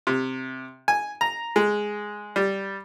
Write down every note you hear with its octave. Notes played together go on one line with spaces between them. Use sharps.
C3
G#5
A#5
G#3
G3